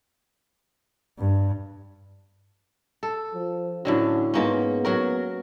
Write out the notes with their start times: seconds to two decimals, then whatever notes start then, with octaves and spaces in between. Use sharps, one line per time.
1.19 G2
3.03 A4
3.35 F3
3.85 A2 D3 F#3 C#4
4.34 G#2 A#3 B3 C#4
4.85 F#3 F#4 A#4